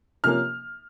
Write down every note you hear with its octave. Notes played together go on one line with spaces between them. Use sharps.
C3 F3 A#3 C#4 F6